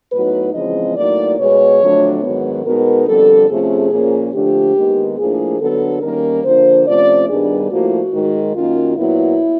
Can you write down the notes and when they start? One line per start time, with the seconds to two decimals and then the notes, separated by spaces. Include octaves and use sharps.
0.12 A2 F#3 B3 D#4 B4
0.54 E2 C#3 F3 G#3 C4 D#5
0.97 A2 F#3 A#3 D#4 D5
1.39 B2 G#3 B3 C#5
1.81 F2 D3 F#3 A3 D4
2.23 G#2 D#3 F#3 B3
2.65 B2 G#3 B3 D#4 A#4
3.08 F2 D3 G3 A4
3.50 C3 F3 A3 C#4 G#4
3.91 A#2 F3 A#3 C#4
4.34 D3 F3 A3 D4 G4
4.76 D#2 D#3 G#3 B3
5.18 A2 F3 A#3 D4 G#4
5.60 D3 F#3 B3 A4
6.02 D#2 D#3 G3 A#3 C#4 A#4
6.44 D3 F3 A#3 D4 C5
6.87 C3 F3 A3 C#4 D5
7.29 G2 D#3 G3 B3 D4 G#4
7.71 A2 F3 A#3 F#4
8.13 G#2 D#3 G#3
8.55 F#2 D#3 F#3 A#3 C#4 F4
8.97 A#2 F#3 B3 E4